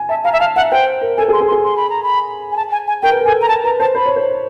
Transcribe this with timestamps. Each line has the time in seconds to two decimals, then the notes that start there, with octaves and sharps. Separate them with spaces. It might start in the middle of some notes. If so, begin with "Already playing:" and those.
Already playing: G#5
0.09 E5 A5
0.24 F5 A#5
0.33 E5
0.40 F5 A5
0.56 E5 F#5
0.71 C5 G5
1.01 A#4
1.17 A4 G#5
1.28 G#4
1.33 C6
1.41 G#4
1.48 C6
1.52 G#4
1.63 C6
1.76 B5
1.90 A#5
2.03 B5
2.52 G#5
2.57 A5
2.71 G#5
2.87 G#5
3.02 A#4 G5
3.11 B4
3.19 A#4
3.25 A4 G#5
3.42 A#5
3.48 A#4 A5
3.64 B4 A#5
3.80 C5 A5
3.95 C5 B5
4.06 C#5
4.16 C5